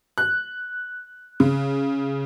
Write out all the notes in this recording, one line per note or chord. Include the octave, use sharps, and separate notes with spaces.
F#6
C#3